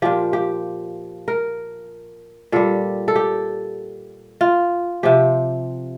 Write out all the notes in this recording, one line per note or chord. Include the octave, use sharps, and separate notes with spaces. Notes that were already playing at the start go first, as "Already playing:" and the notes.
A#2 F3 G4
G4
A#4
A#2 G3 A4
A4
G4
F4
C3 F3 G4